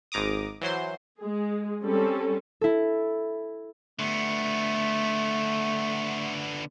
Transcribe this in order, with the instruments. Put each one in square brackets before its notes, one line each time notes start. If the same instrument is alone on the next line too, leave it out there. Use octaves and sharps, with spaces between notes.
[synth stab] G#1 G#2 A#5 D6 D#6
E3 F#3 C5 C6
[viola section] G#3 G#4
G3 C4 C#4 A4
[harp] E4 A4
[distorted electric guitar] D3 B3 [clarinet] A3